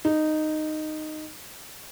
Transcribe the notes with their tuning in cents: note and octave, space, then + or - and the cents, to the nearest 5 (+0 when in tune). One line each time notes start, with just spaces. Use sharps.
D#4 -10